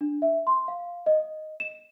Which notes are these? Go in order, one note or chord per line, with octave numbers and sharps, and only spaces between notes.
D4
E5
C6
F5
D#5
E7